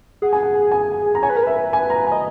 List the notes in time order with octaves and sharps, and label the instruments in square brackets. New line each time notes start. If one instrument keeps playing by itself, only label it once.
[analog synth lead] G#4 [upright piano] F#5
[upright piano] G#5
F#5
G#5
A#5
[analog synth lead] C#5 [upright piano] G#5
[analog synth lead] B4
A#4
[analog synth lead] B4 [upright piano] E5
[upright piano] G#5
A#5
G#5
[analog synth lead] D#5